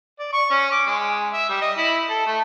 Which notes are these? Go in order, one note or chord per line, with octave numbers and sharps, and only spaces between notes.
D5
C#6
C#4
D6
G#3
E5
G3
D#5
E4
A4
A3